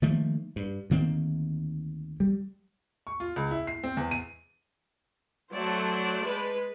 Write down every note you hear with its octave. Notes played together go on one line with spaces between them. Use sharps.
D#3 F3 A3 A#3
G2
D2 D#3 A#3 C4
G3
C#6
F4
C#2
E4
C7
C4
E2
D#7
F#3 A3 C5 D5 A5
G#3 B4